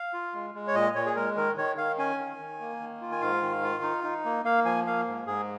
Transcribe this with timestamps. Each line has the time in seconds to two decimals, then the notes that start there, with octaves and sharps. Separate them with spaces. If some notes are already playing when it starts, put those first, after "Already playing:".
Already playing: F5
0.14 F4
0.34 G#3
0.55 G#3
0.68 C#5
0.74 A#2 D#5
0.95 A#2 C#5
1.06 G#4
1.16 G#3 A#4
1.37 D#3 A#4
1.57 D#3 C#5
1.77 D#3 F5
1.98 C#4 G#5
2.18 D#3
2.39 D#3
2.61 A#3
2.80 D#3
3.02 F4
3.12 G#5
3.21 G#2 F5
3.42 D#3
3.63 F4
3.83 D#4
4.04 D#4
4.25 A#3
4.44 A#3 F5
4.65 F3 G#5
4.87 A#3 F5
5.07 G#2
5.27 G#2 G#4